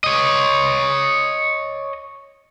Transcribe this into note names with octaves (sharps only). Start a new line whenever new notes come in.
C#5 D#5